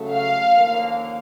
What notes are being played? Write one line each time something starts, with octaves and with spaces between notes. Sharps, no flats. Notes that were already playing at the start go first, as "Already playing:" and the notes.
Already playing: C#3 F#3 A3
F5
D#2 D3 F3 A#3 C#4